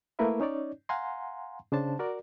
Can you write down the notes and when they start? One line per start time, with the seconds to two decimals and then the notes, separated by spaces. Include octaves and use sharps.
0.19 A3 A#3 E4 A#4 B4 E5
0.40 C#4 D#4 C#5 D5
0.89 F5 F#5 G#5 A#5 C6
1.72 C#3 D4 C5 A5
1.99 F#4 A#4 D5